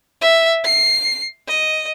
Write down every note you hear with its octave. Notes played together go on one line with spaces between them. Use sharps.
E5
C7
D#5